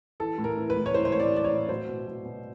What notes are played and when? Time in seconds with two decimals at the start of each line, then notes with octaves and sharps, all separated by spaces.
0.20 E3 A4
0.38 A2
0.44 A#4
0.58 E3
0.70 B4
0.76 A2
0.86 C#5
0.94 E3 C5
1.05 C5
1.12 A2 C#5
1.20 D5
1.32 E3 D5
1.44 C#5
1.51 A2
1.69 F#3 C5
1.88 B2
2.07 F#3
2.25 B2